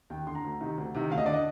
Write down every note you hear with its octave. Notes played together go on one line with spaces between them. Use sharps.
D#2 G5
D3 C6
A#5
D2
C3 D#3
D2
C3 D#3
D2 F5
D#5
D3 D5
D#5